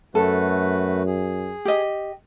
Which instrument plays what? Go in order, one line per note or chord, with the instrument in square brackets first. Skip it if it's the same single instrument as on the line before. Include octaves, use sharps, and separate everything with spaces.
[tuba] F#2 [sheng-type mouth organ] A3 F#4 B4 [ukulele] A4
[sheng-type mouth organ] G#4
[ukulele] G4 D#5